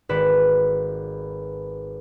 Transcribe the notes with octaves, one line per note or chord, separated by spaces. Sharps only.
G#1 F#4 B4 D5 B5 E7